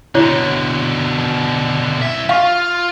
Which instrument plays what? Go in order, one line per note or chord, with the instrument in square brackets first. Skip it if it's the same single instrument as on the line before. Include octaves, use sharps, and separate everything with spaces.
[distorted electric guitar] B2 D3 [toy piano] E4 C#5
[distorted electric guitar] C2 E5
[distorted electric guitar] F4 [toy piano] F5 C#6